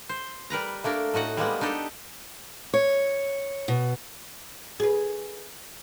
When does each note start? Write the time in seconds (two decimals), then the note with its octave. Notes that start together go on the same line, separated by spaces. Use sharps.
0.09 C5
0.50 G3 A#4 B4 A#5
0.84 A3 A#3 D4 A#4
1.14 A2 D#4 F#4 F#5
1.37 G3 G#3 A#3 B3
1.61 D4 D#4 G4 A4
2.74 C#5
3.68 B2
4.80 G#4 B4